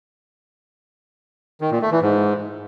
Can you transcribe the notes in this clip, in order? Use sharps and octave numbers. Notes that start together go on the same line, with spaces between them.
D#3
A#2
A3
E3
G#2